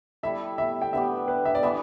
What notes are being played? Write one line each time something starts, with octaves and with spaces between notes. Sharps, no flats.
G3 E4 A4 E5
E5
G5
D3 B3 G4 E5
B4
E5
D5
E3 B3 D4 E5